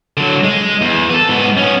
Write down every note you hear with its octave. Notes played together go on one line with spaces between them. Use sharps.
D3 F#3
G#3
E2
A4 B4
G#2 B3
B3 C#4